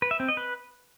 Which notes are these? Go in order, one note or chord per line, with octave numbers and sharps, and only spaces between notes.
B4
E5
C4
D#5
B4